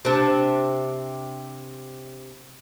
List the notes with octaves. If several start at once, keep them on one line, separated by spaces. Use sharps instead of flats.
C3 D4